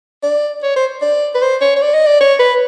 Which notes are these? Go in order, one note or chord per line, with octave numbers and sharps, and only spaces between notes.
D5
C#5
C5
D5
B4
C5
C#5
C#5
D5
D#5
D5
C#5
B4